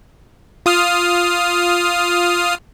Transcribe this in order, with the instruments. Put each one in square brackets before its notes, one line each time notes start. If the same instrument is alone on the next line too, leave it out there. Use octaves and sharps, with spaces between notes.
[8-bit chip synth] F4 D#6 F6